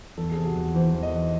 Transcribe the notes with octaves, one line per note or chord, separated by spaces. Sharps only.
E2 A4
C3 G#4
F#4
E2 A4
E3 C5
E2
D#5
E2